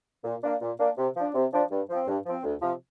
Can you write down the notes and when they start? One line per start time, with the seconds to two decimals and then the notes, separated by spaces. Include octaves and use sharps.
0.24 A#2
0.43 A#3 D4
0.62 A#2
0.79 A#3 D4
0.98 C3
1.16 F3 D4
1.34 C3
1.53 F3 D4
1.71 G2
1.89 F3 C4
2.07 G2
2.26 F3 C4
2.44 D2
2.62 C3 F3